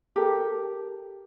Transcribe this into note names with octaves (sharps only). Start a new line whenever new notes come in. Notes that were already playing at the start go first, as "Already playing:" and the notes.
G4 A4 A#4